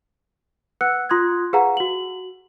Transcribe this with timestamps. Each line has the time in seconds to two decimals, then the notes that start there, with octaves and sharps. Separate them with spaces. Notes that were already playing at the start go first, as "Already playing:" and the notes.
0.81 B4 F#5 E6 F#6 C#7
1.09 F4 C6 D#6 F#6 G#6
1.53 G#4 B4 F5 F#5 A#5
1.77 F#4 F#7